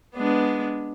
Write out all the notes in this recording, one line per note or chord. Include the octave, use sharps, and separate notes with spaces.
G#3 B3 D4